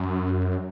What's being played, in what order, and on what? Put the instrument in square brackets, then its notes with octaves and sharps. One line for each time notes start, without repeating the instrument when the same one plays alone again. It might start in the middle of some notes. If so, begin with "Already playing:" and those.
Already playing: [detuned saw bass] F#2